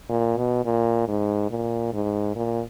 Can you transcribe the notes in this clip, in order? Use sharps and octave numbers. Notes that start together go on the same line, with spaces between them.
A#2
B2
A#2
G#2
A#2
G#2
A#2